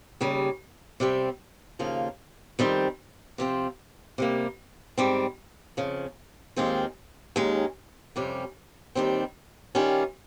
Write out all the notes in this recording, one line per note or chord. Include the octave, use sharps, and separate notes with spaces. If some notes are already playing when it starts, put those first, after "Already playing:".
D#2 C#3 G3
C3 G3 C4
D#2 C#3 F3 A#3 F4
F2 D#3 G3 C4
C3 F3 C4
C3 G3 A#3
G#2 G3 C4
F2 C#3 F3
D#2 D#3 G#3 C4 F4
D#2 D#3 G#3 C#4
F2 C3 G3 C#4
D#2 D#3 G3 C4
D#3 G3 C#4 F4